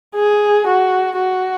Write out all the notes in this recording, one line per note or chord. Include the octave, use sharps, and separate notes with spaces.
G#4
F#4
F#4